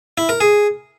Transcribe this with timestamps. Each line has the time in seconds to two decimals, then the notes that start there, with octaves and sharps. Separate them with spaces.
0.18 E4
0.29 A#4
0.41 G#4